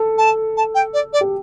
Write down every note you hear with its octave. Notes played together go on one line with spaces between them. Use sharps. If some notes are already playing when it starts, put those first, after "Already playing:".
Already playing: A4
A5
A5
G5
D5
D5
G4